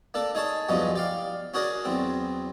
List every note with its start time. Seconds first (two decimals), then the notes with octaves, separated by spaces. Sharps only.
0.14 A#3 D4 A4
0.35 D#4 G#4 C#5 A5
0.69 E2 G2 F3 F#3 C#4 D#4
0.96 G4 D5 F5
1.54 C#4 F#4 G#4 A#4 D5
1.85 E2 F#3 C4